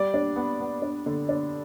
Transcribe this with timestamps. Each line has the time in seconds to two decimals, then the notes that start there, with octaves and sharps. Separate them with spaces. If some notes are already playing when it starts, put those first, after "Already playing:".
Already playing: G3 D5
0.14 D4
0.36 B3
0.60 B3
0.82 D4
1.06 D3
1.29 D4